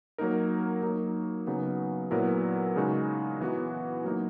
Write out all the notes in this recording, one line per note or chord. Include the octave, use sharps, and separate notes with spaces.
F#3 A#3 D#4 A#4
F#3 A#3 D#4
C#3 F#3 B3 D#4
A#2 F#3 B3 E4 A#4
C#3 G#3 D#4 F#4
E3 B3 F#4
F#3 A#3 D#4